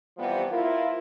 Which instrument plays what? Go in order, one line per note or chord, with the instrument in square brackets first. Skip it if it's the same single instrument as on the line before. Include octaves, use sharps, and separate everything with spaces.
[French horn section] C3 E3 F3 G3 B3
E4 F4 A#4